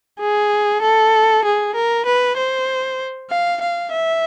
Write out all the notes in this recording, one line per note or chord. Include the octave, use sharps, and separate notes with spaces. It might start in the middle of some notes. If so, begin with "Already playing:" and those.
G#4
A4
G#4
A#4
B4
C5
F5
F5
E5